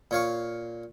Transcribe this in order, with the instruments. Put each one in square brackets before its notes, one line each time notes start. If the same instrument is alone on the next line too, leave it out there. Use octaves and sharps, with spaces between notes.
[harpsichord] A#2 C#5 F5 C#6